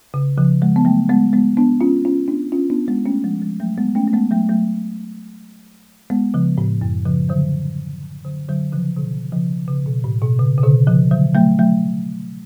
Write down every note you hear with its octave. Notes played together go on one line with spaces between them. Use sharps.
C#3
C#3 F3
F3 G#3
B3
F#3 A3
G#3 B3
G#3 B3
B3 D4
C#4 F4
C#4 F4
B3 D4
C#4 F4
B3 D4
G#3 B3
A3 C#4
F3 G#3
F3 G#3
F#3 A3
G#3 B3
A3 C#4
A3
G#3 B3
F#3 A3
F#3 A3
G#3 B3
C#3 F3
A2
F#2
C#3 F3
D3 F#3
D3 F#3
D3 F#3
C#3 F3
B2 D3
C#3 F3
C#3
B2
A2
B2
C#3
C#3
B2 D3
C#3 F3
D3 F#3
F#3 A3
F#3 A3